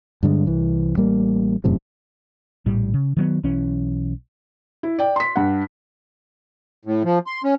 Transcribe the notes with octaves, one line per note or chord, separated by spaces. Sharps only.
G2 D3 G3 G#3
C2 E3
A1 G3 A#3
E1 F#2 A2 C3
A#1 A2 G3
C#3
D#3 F#3 B3
B1 E3 C#4
E4
D5 G5
C6 B6
G2 F#5
A2
F3
C6
C#4